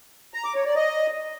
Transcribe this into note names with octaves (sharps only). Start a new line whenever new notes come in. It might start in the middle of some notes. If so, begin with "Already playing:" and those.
A#5
D6
C#5
D5
D#5